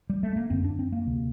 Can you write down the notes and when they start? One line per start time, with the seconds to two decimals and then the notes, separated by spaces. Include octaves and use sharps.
0.10 G3
0.23 A3
0.36 A#3
0.50 F#2 D3 C4
0.64 D4
0.79 C4
0.92 A#3
1.07 D2 C3